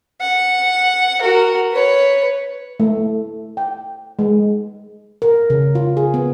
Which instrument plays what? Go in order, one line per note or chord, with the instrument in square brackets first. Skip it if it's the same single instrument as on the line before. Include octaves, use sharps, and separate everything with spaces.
[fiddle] F#5
F#4 A#4
B4 C#5
[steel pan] A3
G5
G#3
[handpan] A#4
C#3
F4
G#4
B3